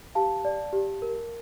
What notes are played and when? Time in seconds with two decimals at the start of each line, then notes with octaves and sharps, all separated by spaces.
0.15 G4 F5 A5
0.45 D5
0.73 G4
1.02 A#4